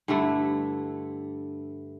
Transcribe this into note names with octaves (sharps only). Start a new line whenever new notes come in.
G2 D3 A3 E4